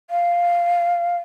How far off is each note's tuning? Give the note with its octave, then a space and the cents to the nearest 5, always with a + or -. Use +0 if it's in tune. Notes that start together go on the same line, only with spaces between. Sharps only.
F5 -5